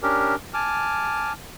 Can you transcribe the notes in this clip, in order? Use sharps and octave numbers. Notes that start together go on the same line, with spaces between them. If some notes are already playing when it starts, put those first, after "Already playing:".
C#4 D4 G4 A#4
G#5 A5 D6 F6